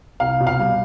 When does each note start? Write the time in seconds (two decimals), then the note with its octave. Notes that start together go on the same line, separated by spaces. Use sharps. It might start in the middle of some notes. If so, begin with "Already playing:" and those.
0.20 C2 F5
0.40 B2
0.47 F5
0.59 G3